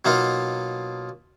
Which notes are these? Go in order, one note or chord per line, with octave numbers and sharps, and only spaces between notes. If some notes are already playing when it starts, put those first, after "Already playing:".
B2 F#3 A#3 D#4 F4